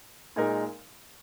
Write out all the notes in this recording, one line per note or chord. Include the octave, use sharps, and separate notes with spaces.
A#2 G#3 D#4 A#4